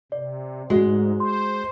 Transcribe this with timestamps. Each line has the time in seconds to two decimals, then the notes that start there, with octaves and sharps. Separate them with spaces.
0.12 C3 D5
0.70 G#2 G#3 F#4
1.20 C5 C6